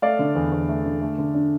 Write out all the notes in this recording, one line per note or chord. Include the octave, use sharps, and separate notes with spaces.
A3 D5 F5
D3
E2
E2
A3
D3
A3
D3
D4